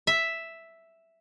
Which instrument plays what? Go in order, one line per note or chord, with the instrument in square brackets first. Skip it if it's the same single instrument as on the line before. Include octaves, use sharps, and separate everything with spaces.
[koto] E5